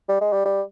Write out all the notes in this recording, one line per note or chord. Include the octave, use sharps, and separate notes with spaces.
G3
G#3
G3
G3